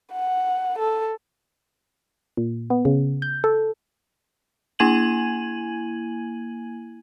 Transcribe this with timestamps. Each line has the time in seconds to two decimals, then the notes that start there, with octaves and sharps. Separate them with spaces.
0.14 F#5
0.79 A4
2.37 A#2
2.70 B3
2.85 C#3
3.22 G6
3.44 A4
4.79 A#3 E4 G#5 G#6 D#7 F#7